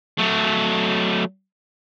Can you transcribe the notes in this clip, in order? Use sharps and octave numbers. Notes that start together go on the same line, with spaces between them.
F#3 A3